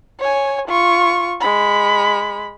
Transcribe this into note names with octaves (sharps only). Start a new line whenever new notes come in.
C#5 G#5
F4 C#6
G#3 B5